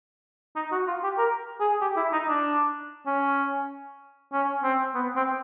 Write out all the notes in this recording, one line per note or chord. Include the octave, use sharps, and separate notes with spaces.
D#4
F#4
F4
G4
A#4
G#4
G4
E4
D#4
D4
C#4
C#4
C4
B3
C4